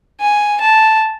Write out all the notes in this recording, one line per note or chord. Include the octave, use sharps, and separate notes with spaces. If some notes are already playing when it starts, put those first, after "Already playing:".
G#5
A5